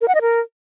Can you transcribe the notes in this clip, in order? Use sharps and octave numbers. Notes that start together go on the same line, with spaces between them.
A#4
F#5
D#5
A#4